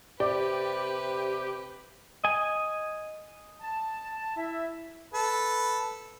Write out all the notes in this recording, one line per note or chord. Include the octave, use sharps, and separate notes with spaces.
C3 G4 B4 D5
D#5 G#5
A5
E4 E5
A4 B4